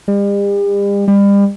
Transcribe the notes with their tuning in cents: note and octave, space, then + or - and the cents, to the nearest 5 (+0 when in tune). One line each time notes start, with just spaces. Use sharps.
G3 +40
G3 +35